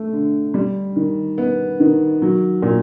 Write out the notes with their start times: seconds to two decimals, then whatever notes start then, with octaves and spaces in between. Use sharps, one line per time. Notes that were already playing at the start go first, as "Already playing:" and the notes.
Already playing: A3
0.12 D3
0.54 G3
0.96 D#3
1.38 B3
1.80 D#3
2.22 F#3
2.62 A#2